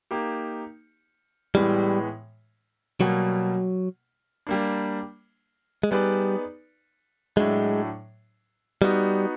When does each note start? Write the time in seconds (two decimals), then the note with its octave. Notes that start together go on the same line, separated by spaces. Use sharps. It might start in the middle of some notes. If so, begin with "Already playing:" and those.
0.11 A#3 D#4 G4
1.55 A2 E3 G3 G#3 B3
3.01 B2 F#3 G3 A#3
4.47 G3 A#3 D4
5.83 G#3
5.91 G3 B3 D#4 G#4 B4 D5
7.36 A2 F#3 G#3 A3 D4
8.82 G3 B3 D#4 F#4